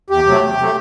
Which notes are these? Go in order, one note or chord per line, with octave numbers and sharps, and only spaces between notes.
E2 G4
C3 F#3 A3
E2
C3 F#3 A3